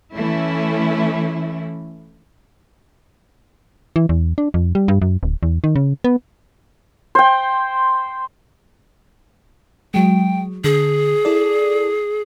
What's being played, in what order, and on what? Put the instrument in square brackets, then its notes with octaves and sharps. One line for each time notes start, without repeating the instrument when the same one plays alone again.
[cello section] E3 A3 C#4 E4
[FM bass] E3
E2
D4
F2
G3
G2
F#2
D1
E2
D#3
C#3
B3
[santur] C5 G5
[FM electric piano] F#3 G#3 [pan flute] G5
[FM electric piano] D3 [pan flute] G#4
[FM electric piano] E4 A4 D5